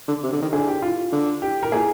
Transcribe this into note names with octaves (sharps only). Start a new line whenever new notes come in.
D3
C3
D3
D#3
D3 G#4
G4
F4
D3
G4
A#4
A#2 G#4